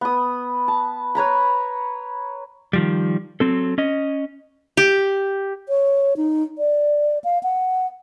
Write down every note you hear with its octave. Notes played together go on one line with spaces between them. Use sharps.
B3 D#6
A5
B4 C#5 A#5 B5
D#3 F3 G3
F#3 C4 A4
C#4 D#5
G4
C#5
D#4
D5
F5
F#5